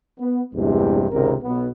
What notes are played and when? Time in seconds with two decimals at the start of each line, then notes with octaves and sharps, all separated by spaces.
0.20 B3
0.54 A#1 E2 G2 C3 E3 G#3
1.11 G#1 C#2 C3 A#4
1.43 B1 B2 B3